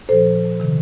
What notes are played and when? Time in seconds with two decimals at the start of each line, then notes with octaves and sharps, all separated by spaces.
0.09 A#2 F3 A4 C5
0.60 C3 D#3